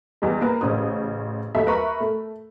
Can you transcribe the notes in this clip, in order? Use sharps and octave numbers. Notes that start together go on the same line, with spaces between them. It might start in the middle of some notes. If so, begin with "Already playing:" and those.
E2 G3 G#3
A#3 A#4 B4
A1 C#3 C5 D#6
D#2 F#3 A3 E5 B5
A#4 B4 E5 B5 C#6
A3